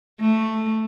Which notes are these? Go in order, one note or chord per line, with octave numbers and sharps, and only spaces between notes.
A3